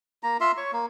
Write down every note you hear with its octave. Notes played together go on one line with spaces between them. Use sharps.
A#3 A#5
F4 E5 C6
C#5 C#6
A#3